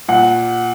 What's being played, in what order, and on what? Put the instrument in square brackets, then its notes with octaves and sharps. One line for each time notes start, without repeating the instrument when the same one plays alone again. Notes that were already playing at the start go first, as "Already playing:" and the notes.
[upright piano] A#2 F#5